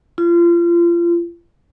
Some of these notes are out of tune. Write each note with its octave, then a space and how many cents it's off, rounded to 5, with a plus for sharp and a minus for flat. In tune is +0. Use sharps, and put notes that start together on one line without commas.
F4 -30